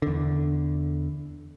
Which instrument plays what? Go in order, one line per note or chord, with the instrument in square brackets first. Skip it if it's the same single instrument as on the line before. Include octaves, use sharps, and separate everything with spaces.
[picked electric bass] E2 D3